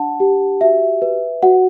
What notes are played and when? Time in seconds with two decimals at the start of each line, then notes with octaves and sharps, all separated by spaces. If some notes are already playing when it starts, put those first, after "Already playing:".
Already playing: D4 F#5 A5
0.20 G4
0.61 F#4 E5
1.02 B4
1.43 F#4 F#5